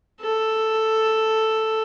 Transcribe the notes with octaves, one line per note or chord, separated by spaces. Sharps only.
A4